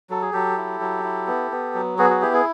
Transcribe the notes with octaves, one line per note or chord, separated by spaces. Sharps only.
F#3 A4
G#4
F#3 G4 A4
E4
F#3
E4
B3
B3
F#3
B3 F#4 G#4
F#4
E4 G4
G#4